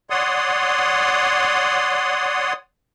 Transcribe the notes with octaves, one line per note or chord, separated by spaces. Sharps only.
C#5 D5 F#5 C6 D#6